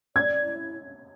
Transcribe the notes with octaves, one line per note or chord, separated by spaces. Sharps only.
D5 G#6
E4